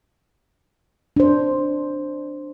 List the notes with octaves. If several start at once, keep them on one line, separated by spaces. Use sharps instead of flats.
D4 C5